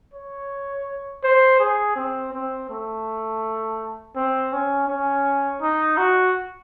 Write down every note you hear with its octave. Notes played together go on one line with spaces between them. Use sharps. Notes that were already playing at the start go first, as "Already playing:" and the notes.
C#5
C5
G#4
C4
C4
A3
C4
C#4
C#4
D#4
F#4